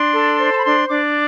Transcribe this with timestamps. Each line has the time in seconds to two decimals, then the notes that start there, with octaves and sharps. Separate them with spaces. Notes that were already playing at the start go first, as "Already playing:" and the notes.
Already playing: D4 C6
0.13 A4
0.38 C5
0.50 A5
0.57 B5
0.64 D4 C6
0.89 D4 D6